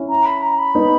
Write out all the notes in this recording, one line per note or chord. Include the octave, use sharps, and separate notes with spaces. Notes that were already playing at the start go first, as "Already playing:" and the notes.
Already playing: C#4 E4
A#5
B5
A#5
B5
B3 D#4